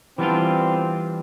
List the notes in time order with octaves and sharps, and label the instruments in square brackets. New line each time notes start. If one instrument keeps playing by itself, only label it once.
[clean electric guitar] E3 G3 B3 D4 F4 [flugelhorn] C4